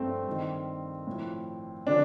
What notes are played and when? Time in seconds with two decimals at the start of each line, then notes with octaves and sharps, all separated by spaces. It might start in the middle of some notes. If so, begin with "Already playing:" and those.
Already playing: G2 F3 A3 C4
0.27 G2 D#3
1.07 A2 F3
1.87 D3 F3 D4